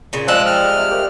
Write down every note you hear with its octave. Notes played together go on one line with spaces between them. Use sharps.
A#2 C#3
F3 G3 G#3 E6 F#6
F6
C3
A3 A#3 G4